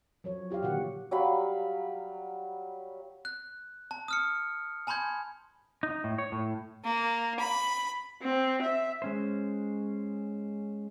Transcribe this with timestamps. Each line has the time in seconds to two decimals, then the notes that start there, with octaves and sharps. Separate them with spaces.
0.24 F3 F#3 C#5
0.50 F4 G4 D5 F5
0.63 A#2 D3 D#3 F#4 F#5
1.11 F#3 G3 F5 B5
3.25 F#6
3.91 A5
4.08 D#6 F6 C#7
4.87 G#5 A5 B5 C6 G6 G#6
5.83 D#4
6.04 A2
6.18 C#5
6.32 A2
6.84 A#3
7.40 B5
8.22 C4
8.63 E5
9.02 G#3 C#4 C5